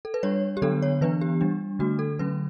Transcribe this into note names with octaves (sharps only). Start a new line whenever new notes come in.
A4
B4
G3 D4 C#5
G4
D3 F#3 B3 D4 A4
C#5
E3 B3 D4 B4
G4
G3 D4
D3 A3 D4 F#4
A4
D3 F#3 C#4 B4